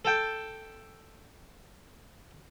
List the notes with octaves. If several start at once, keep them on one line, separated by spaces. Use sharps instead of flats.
A4 G5